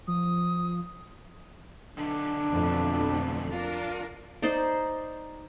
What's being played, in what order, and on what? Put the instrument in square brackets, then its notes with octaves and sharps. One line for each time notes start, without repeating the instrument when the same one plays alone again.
[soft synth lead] F3 [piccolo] D#6
[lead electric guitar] B1 D3 [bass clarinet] D4
[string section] F2 B2 A3
[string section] D4 A#4 [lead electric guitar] F4
[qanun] D#4 C5 D5